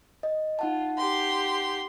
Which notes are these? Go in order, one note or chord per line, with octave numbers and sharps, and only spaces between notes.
D#5
D#4 F4 F#5 A5
G4 C6